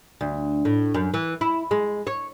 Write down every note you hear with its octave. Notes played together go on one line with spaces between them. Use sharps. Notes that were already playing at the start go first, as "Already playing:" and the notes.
D2
A2
F#2
E3
E4
G#3
C#5